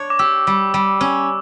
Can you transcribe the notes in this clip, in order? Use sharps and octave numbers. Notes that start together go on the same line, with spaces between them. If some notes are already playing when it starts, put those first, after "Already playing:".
Already playing: D4 C#5
D6
G4 E6
G3
G3
C#4